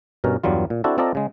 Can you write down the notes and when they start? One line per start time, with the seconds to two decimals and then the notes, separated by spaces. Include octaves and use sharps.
0.24 G2 B2 C#4 A#4
0.44 E2 G2 F#3 G3 F4
0.70 A#2
0.84 C4 D4 E4 F#4 A4
0.98 C4 F4 A4 D5 D#5 A#5
1.15 C#3 G#3